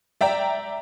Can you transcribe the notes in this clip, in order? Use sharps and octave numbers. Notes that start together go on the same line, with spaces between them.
D5 E5 G5 A#5